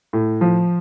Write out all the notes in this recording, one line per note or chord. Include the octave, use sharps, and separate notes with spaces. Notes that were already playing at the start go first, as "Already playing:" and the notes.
A2
F3